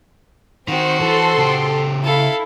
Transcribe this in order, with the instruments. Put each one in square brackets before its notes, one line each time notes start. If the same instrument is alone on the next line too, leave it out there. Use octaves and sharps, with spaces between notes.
[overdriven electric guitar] D#3 [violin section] C4 [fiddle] F#4 C5
[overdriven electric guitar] E3 [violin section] A4 C6
[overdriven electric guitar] C#3 G4
[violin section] E4 [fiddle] A4 F5